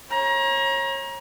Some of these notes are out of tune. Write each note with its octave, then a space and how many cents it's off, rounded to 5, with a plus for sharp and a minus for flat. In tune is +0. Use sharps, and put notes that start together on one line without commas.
C#5 -30 A#5 +30